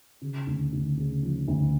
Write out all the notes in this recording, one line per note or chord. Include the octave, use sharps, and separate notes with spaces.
C#3
D2
D2
C#3
F3
D2